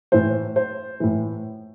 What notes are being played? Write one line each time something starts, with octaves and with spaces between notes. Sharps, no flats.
A2 E3 C5
C5
A2 E3